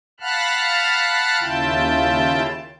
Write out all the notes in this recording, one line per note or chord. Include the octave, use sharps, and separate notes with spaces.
F5 F#5 A5 B5 F6 F#6
D#2 C#3 E4 F4 G5 A5